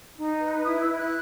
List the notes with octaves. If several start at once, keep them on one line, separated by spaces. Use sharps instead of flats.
D#4
B4
E4 D#6
E6
E4
F#6